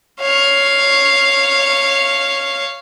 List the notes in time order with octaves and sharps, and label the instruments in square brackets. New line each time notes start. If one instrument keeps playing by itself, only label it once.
[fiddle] C#5 F5